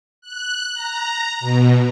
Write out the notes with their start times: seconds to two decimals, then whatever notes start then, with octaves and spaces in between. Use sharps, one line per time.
0.21 F#6
0.74 A#5
1.40 B2